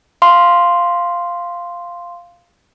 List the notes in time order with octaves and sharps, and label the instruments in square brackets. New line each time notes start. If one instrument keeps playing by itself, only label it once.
[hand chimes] F5 C6